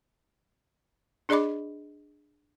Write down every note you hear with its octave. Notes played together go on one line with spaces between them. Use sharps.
D4 G#4 D5 D#5 B5 D6